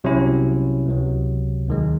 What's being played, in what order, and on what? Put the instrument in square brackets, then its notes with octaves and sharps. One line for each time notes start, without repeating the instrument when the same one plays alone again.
[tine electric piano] C2 C3 F#3 C#4 E4
C#2 C3 F#3
D#2 D#3 G#3